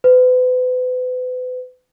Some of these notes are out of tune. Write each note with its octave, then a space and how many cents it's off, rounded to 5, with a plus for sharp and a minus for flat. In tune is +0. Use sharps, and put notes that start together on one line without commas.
B4 +40